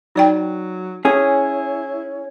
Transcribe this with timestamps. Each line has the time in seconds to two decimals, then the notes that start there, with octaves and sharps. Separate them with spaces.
0.16 F#3 D#4 D5 G5
1.05 C#4 E4 G#4 C#5